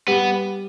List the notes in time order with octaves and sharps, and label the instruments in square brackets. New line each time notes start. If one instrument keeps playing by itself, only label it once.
[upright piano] G3 [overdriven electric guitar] B3